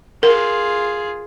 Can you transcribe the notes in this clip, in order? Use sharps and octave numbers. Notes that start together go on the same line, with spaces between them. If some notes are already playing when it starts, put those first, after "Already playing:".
F4 G#4 A#4